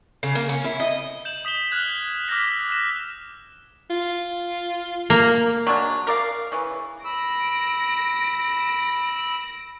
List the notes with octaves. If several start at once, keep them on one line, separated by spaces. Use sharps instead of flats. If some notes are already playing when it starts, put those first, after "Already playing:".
C#3
A#3
C#4
E4
D#5
G6 E7 F#7
D#6 B6 E7 G7
F6 F#6 G#6 F7
D6 E6 F6 G6 A#6 B6
E6 F#6 A#6 B6 E7
F4
A#3
F#3 G#3 D4
A#4 D5 F5
C#3 E3
B5 E6 A#6 D7